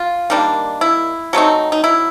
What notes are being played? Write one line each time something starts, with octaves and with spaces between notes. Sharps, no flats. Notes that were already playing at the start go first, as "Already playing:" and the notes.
Already playing: F4
D#3 G3 A#3 D4
E4
F#3 A3 C4 D#4
D#4
E4